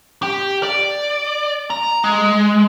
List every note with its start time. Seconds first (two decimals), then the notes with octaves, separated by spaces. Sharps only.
0.23 G4
0.63 D5
1.70 A#5
2.04 G#3